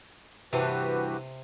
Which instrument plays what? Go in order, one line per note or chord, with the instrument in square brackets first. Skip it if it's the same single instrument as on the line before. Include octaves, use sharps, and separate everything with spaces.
[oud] G2 E3 [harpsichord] C3 [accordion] F#4 G4 B4